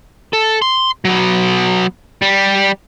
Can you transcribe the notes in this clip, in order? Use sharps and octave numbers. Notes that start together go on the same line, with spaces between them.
A4
C6
F#3 B3
G3